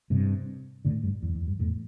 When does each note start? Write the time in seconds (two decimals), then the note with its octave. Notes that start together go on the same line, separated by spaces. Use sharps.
0.10 G2 C3
0.85 A2 D3
1.03 G2
1.22 E2
1.35 E2
1.47 G2
1.59 E2 A2